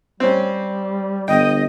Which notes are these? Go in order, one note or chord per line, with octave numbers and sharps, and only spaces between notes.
G3 C4 C#4
G1 D#5 G5